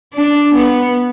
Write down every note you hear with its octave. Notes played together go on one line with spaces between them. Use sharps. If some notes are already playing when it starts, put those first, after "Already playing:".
D4
B3